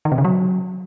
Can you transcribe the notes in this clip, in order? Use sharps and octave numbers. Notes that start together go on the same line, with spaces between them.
D#3
C3
C#3
F#3